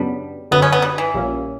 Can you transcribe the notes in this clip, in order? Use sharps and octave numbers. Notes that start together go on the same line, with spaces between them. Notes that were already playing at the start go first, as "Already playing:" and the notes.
Already playing: F#2 C#3 F#3 G3 B3 D4
G1 F#2 D3 F#3 B3
C#4
B3
G3
E3
A#1 A#2 G3 A#3 C#4